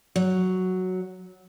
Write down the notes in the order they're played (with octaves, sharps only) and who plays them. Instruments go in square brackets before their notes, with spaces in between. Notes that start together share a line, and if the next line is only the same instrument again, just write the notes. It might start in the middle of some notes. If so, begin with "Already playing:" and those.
[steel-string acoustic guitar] F#3